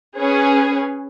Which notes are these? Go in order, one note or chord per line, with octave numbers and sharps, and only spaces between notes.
C#4 G#4 B4